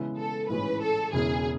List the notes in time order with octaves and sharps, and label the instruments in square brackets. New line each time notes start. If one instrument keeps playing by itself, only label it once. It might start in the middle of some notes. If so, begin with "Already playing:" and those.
Already playing: [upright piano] C#3 E3 G#3 B3 E4
[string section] A4
[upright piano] A1 G#2 E3 G#3 C#4 [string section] B4
[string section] A4
[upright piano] E1 E2 C#3 E3 [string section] G#4